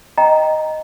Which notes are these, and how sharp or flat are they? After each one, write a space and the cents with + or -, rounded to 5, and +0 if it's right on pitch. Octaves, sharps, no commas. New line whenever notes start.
D#5 +0 G5 +0 A#5 +0